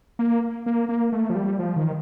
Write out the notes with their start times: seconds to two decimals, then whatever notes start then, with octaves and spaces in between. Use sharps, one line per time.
0.19 A#3
0.66 A#3
0.89 A#3
1.12 A3
1.30 F3
1.35 G3
1.59 F3
1.76 D#3